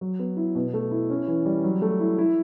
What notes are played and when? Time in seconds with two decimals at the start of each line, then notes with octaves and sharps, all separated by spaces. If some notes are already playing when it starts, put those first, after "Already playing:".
0.01 F#3
0.19 B3
0.37 E4
0.55 B2
0.74 A3
0.91 E4
1.10 C#4
1.28 E3
1.46 G3
1.64 F#3
1.82 A3
2.00 E4
2.18 E4